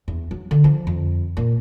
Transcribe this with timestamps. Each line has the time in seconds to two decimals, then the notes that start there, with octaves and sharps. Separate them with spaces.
0.08 E2
0.31 F#3
0.51 D3
0.64 F3
0.87 F2
1.37 A#2